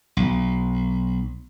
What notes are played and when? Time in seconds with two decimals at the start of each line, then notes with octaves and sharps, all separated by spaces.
0.17 B1